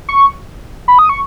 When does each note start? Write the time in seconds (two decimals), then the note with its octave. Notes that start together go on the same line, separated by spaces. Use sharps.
0.09 C#6
0.88 B5
0.99 D#6
1.09 C#6